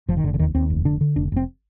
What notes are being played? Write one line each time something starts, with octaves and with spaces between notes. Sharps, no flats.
F1 F3
D#3
F1 D3
D3
D#2 D#3
D#2 C4
F1
D3 D4
D3
F1 D4
F1 C4